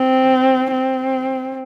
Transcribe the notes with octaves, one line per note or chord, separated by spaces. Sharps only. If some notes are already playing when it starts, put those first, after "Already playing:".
Already playing: C4
C4